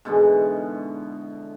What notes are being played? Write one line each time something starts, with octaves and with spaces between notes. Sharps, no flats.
G#2 B2 D3 E3